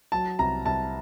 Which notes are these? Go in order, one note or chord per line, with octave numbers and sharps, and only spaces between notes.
F#3 A5
C2 A#5
C2 A5